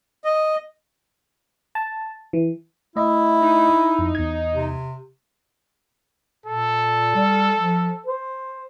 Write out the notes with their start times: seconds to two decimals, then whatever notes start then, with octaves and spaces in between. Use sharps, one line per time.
0.24 D#5
1.75 A5
2.33 E3
2.96 A3 E4 D#5 E5
3.42 D#4
3.99 F2
4.15 E2 G#6
4.54 C3
6.46 A#2 A4
7.15 G3
7.58 F3
8.06 C5